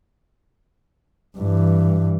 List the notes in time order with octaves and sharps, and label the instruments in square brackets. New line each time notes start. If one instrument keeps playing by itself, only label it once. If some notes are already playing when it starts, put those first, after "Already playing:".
[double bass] G2 E3